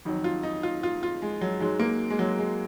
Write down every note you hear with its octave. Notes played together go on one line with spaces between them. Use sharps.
F2 D#3 F#3
F4
D#4
F4
F4
F4
G#3
F#3
G#2 F#3 G#3
A#3
G#3
F#3
G#3